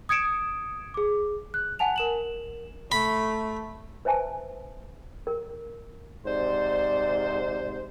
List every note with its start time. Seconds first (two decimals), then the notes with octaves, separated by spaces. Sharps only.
0.09 D#6 G#6 C#7 D7 E7
0.94 G#4 D6
1.54 F#6
1.79 F#5 G#5 A5 F7
1.96 A#4 E7 F#7
2.92 A3 B5
4.05 B4 C5 E5 G#5 A5
5.27 A#4
6.26 G#2 C3 C5 D5